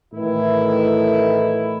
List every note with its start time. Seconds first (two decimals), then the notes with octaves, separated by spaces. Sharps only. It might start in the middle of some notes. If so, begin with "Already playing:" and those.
0.13 A2 D#3 E3 A3 E4